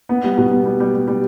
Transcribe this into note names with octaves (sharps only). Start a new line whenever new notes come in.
B3
G3
B2
B3
G3
G3
G3
G3